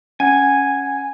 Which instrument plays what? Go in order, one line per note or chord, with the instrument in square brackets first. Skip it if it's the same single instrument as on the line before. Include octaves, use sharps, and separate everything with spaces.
[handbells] C#4 F#5 G#6 [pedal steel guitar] G#5